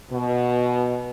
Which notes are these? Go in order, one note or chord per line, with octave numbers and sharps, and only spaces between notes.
B2